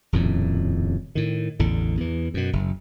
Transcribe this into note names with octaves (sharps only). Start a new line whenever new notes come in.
D#1 F2 A2 C#3
A2 D#3
A1 E2 D3
E2 E3
F#2 B2
F#1